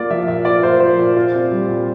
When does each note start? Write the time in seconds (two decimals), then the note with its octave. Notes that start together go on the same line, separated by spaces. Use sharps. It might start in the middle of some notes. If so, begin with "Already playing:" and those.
Already playing: A#3 F4 D5
0.10 F3 E5
0.27 A#2 E5
0.45 F4 D5
0.63 A#3 C5
0.80 F3 C5
0.98 A#2
1.16 F4
1.34 C4
1.51 G3
1.68 A#2